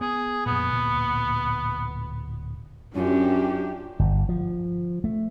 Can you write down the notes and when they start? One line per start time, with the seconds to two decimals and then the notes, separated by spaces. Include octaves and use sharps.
0.01 B3 G#4
0.46 F2 A#2 B3
0.73 D1 A#2
2.95 F#2 C#4 D4 F4 G4
3.99 G1
4.29 F3
5.04 A3